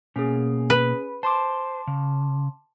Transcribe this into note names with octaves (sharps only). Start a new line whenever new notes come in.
B2 A#3 C#4 G#4
B4
C5 A5 C6 D6
C#3